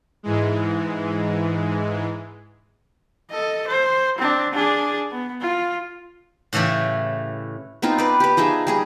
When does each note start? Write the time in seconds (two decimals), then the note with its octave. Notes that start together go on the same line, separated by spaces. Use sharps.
0.23 G#2 E3 G#3
3.31 A4 D#5
3.68 C5
4.19 C4 D4
4.54 D4 G#4
5.12 B3
5.41 F4
6.53 A2 C#3 E3 A3 G4
7.82 B3 C4 D#4 F4
7.98 B4 D5
8.20 G4 B4
8.37 F3 D#4 G#4 E5
8.67 G3 G#4 D#5